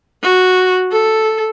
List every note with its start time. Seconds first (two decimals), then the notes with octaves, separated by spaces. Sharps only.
0.23 F#4
0.92 A4